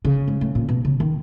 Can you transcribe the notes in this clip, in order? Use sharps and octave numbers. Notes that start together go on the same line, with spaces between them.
C#3
G#2
A2
A#2
B2
C#3
D#3